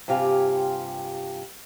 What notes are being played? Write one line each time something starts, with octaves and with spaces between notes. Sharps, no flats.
G2 C3 F4 G4 F5 G#5